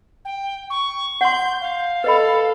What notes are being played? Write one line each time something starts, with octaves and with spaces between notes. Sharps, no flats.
G5
C#6
F#5 C6 G6
F5
A4 B4 D#5 B5